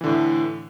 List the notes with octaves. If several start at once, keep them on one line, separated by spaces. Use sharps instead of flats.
A2 D3 E3